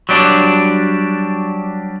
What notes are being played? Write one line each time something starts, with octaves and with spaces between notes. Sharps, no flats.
F#3 G3 D4